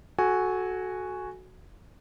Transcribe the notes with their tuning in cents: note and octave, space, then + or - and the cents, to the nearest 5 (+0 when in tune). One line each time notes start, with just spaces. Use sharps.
F#4 +0 A4 -25 G#5 +0